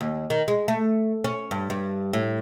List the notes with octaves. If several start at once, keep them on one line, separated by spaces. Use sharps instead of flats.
D#2
D#3
G#3
A3
C#4
G2
G2
A2